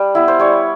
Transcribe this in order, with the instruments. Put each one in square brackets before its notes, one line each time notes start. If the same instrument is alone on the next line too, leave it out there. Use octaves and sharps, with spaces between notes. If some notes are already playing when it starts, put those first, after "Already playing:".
Already playing: [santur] G3
B3 E4
C5
G3 C#5